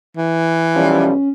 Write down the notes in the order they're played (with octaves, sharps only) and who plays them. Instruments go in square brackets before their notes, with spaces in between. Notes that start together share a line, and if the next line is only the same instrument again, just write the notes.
[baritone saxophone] E3
[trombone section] B1 F3 G3 [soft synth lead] C#4